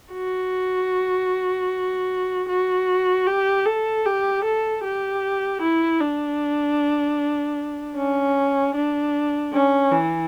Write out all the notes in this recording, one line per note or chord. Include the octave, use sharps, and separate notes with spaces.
F#4
F#4
G4
A4
G4
A4
G4
E4
D4
C#4
D4
C#4
E3